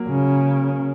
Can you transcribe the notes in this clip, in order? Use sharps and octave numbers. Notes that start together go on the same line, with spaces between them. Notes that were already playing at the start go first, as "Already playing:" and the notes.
Already playing: F#3 A#3
C#3